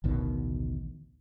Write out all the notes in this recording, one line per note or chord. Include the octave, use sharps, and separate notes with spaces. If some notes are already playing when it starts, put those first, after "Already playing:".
A1 D2 B2 D#3